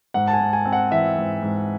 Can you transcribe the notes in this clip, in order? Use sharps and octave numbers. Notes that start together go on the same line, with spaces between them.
G#2 F#5
A5
G#5
G#2
G#5
C4
F#5
E3 E5
G#2
G#2